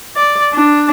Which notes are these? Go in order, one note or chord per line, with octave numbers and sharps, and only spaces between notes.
D5
D4